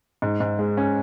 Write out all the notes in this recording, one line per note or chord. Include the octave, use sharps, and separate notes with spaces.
G#2
G#2
G#3
C#4